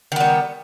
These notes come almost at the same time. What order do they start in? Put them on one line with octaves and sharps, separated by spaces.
D#3 B3 G3